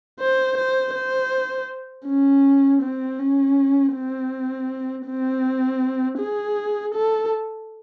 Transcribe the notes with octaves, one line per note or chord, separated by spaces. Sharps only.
C5
C5
C5
C#4
C4
C#4
C4
C4
G#4
A4